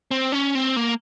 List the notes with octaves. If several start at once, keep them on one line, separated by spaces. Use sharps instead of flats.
C4
C#4
C4
A#3